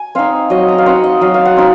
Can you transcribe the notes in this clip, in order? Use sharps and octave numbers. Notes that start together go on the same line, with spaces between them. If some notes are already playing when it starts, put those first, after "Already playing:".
Already playing: G#5
C4 D#4 F5
F#3 D#5
A#5
F5
C4 D#4 F#5
D#5
F#3 F5
F5
F#5
C4 D#4